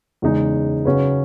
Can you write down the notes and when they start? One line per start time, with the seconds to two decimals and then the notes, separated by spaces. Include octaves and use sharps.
0.22 E2 C#3 G#3 D#4 G#4
0.85 C#3 F#3 C#4 G#4 B4